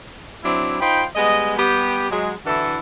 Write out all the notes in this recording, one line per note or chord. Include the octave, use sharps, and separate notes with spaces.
F#3 C4 D4 E4
D#4 F4 C5 G5 B5
G3 G#3 B3 D#5
G3 B3 G4
F#3 G#3
D3 E3 E4 F#4 A4